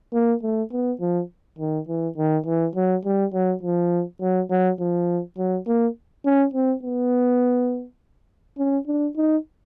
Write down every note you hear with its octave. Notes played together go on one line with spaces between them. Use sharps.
A#3
A3
B3
F3
D#3
E3
D#3
E3
F#3
G3
F#3
F3
F#3
F#3
F3
F#3
A#3
C#4
C4
B3
C#4
D4
D#4